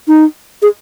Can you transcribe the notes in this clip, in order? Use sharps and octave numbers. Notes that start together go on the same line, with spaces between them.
D#4
G#4